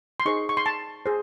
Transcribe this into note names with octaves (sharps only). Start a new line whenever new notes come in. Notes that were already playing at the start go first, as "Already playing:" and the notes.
C6
D#4 G#4 C5 C#6
C#6
C6
A5
G#4 C5